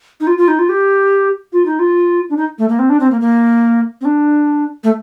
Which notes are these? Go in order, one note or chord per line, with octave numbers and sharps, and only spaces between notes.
D#4
F4
F4
D#4
F4
G4
F4
D#4
F4
D4
D#4
A3
A#3
C4
D4
C4
A#3
A#3
C4
D4
A3